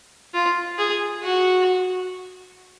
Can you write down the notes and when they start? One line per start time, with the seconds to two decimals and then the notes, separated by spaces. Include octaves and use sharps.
0.34 F4
0.78 G#4
1.23 F#4